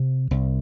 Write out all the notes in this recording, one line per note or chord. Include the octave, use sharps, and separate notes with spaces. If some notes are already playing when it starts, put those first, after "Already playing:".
Already playing: C3
C2